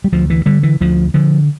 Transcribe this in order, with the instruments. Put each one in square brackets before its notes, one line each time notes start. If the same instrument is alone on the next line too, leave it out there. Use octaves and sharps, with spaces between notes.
[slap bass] G3
D2 F3
E3
D3 G3
E3
D2 F3
D3 F3